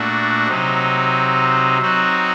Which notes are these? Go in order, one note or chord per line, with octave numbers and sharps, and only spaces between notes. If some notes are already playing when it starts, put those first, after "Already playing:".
Already playing: A#2 A3 D4 F#4
C3 F#3 C4 D#4
F#3 C4 D#4 F#4